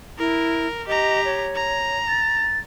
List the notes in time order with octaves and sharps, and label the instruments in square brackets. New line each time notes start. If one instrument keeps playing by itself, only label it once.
[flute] E4 [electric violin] A#4
[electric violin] G4 A#5 [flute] D#5
[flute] C#5
[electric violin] A#5
[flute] A6